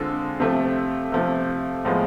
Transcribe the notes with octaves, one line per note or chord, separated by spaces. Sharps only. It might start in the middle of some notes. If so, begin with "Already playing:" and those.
Already playing: D3 G#3 C4 F4 A4
C3 F3 A3
C3 F3 A3
A2 F3 G#3 B3